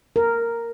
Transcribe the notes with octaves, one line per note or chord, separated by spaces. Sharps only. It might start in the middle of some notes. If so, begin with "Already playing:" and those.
A#4